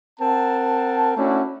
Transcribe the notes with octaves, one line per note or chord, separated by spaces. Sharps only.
C4 A#4 F#5 A5
A3 C#4 D4 E4 F#4